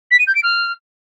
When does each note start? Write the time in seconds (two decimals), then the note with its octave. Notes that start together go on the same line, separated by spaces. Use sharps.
0.11 B6
0.19 D#7
0.27 G6
0.35 D7
0.43 F6